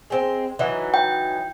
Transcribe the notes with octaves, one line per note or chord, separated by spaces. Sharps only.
G#3 C4
E3 F#3 D#4
G5